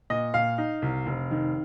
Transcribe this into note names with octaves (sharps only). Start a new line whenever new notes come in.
A#2 D#5
A#2 F5
D#4
C2
F1
D#3